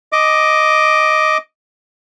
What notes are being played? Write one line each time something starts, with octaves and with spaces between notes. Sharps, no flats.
D#5 D6